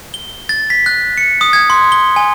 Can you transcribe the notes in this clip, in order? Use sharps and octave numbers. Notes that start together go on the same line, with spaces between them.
G7
A6
B6
F#6
C#7
D#6
G#6
C6
G7
G#5